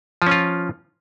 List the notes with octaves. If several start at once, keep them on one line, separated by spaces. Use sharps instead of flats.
F3 C#4 F4